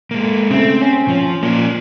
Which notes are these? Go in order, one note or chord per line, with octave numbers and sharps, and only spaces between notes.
G#3 A#3
C#3 A3 C4
C#4
F3
A#2 C#4 D5